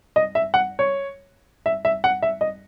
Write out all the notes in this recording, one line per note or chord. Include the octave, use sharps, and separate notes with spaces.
D#5
E5
F#5
C#5
E5
E5
F#5
E5
D#5